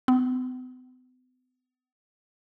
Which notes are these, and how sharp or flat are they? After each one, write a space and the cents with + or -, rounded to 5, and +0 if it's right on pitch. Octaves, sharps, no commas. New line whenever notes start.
B3 +45